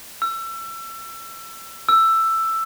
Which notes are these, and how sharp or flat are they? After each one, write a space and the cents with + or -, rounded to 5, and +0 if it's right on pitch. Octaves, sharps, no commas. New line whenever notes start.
E6 +25
E6 +10